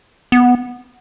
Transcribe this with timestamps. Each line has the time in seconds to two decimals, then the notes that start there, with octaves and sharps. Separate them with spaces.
0.32 B3